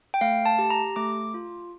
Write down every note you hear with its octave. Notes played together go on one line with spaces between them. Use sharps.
G5
A3 F5
A5
G4
A#5
A3 D6
F4